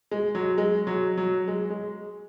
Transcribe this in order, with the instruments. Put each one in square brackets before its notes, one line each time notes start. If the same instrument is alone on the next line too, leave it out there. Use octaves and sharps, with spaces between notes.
[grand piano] G#3
F#3
G#3
F#3
F#3
G#3
G#3